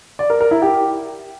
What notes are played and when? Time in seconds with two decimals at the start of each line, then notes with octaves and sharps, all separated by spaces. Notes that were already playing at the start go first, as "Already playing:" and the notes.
0.19 D5
0.30 A#4
0.41 A#4
0.51 E4
0.62 G4